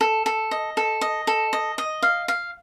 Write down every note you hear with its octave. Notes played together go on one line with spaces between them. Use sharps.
A4
A4
D#5
A4
D#5
A4
D#5
D#5
F5
F5